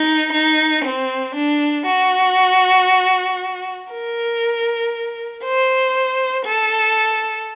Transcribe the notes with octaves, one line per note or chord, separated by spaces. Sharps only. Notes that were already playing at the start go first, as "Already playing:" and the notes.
Already playing: D#4
D#4
C4
D4
F#4
A#4
C5
A4